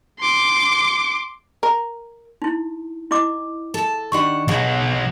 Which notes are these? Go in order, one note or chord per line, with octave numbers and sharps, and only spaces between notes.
C6 D6
A#4
D#4 E4
E4 D#5 D6
A4 A5
D#3 D4 F#4 G4 F#5 C#6
B1 B2 F#3 G#4